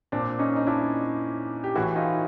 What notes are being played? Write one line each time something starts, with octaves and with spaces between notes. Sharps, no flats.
A#2 C4 D4
C#4 D#4
D#4
D4 E4
G4
A2 E3 E4 F#4
D#4 F4